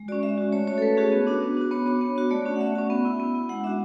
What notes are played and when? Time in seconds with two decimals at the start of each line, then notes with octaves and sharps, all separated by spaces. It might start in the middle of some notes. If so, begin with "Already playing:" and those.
Already playing: G#3
0.08 F#4 D5
0.12 C#4
0.23 G#3 E5
0.38 C#4 F#4
0.52 A3 C#5
0.67 C#4 F#4 C#5
0.78 A4
0.82 A3 B4
0.97 C#4 F#4 G#4
1.12 B3
1.27 D4 F#4
1.42 B3
1.57 D4 F#4
1.71 B3 C#5
1.86 D4 F#4 C#5
2.01 B3
2.16 D4 F#4
2.31 A3 D5
2.46 C#4 F#4
2.56 F#5
2.61 A3 E5
2.75 C#4 F#4
2.90 B3
3.05 E4
3.20 B3
3.35 E4
3.49 G#3 F#5
3.64 D4 F#4 E5